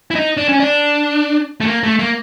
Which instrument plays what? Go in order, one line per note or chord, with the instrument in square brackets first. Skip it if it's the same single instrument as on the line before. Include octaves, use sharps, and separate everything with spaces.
[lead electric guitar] E4
D#4
D4
C#4
D4
A3
A#3
A3
A#3